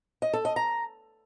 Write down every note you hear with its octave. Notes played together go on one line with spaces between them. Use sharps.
D#5
A4
D#5
A#5